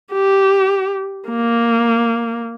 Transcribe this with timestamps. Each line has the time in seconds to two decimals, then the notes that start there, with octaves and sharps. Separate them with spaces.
0.12 G4
1.29 A#3